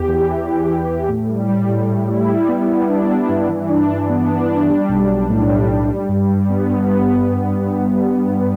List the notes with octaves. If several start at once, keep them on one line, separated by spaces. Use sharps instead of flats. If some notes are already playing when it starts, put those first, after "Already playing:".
Already playing: E2 G4
E3
E2
E3
E2
E3
A2
G3
G3
A2
A2
E4
G3
B3
G3
D4
D4
G2
E3
D4
E3
B3
D4
D4
G3
B1
G3
A2
G3
A2
G3
G2
G3
B3
G2
B3